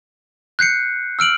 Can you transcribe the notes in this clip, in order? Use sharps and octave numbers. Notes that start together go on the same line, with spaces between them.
F#6 G6 C7 C#7
E6 F6 D7 F#7